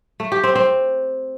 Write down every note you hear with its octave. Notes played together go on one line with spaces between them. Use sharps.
A3
G4
C4
C4